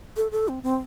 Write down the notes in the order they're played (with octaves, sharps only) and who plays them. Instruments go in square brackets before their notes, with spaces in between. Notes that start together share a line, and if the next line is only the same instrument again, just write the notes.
[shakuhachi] A4
A4
C4
C4